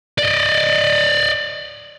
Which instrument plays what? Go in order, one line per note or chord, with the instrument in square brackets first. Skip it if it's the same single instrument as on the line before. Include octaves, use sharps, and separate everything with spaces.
[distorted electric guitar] D5 D#5